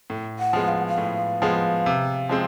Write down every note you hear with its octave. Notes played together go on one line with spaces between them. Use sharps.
A2
F#5
F3 G#3 B3
F5
F#5
F5
A2
F3 G#3 B3
C3
F3 G#3 C4